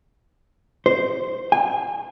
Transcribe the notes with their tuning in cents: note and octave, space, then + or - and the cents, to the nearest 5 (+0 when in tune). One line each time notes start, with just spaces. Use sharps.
C5 -10
G#5 -30